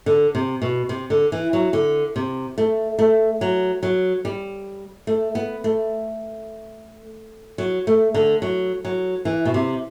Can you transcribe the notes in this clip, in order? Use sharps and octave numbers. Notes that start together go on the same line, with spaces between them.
D3
C3
B2
C3
D3
E3
F#3
D3
C3
A3
A3
F#3
F#3
G3
A3
B3
A3
F#3
A3
D3
F#3
F#3
E3
B2
C3